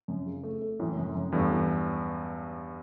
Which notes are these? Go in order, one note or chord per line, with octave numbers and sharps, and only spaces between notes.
F#2
C#3
A3
A3
F#2 A2 E3
F#2
F#2
E2 G2 A3
E3